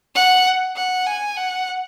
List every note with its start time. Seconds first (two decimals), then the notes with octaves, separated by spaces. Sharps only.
0.15 F#5
0.76 F#5
1.06 G#5
1.37 F#5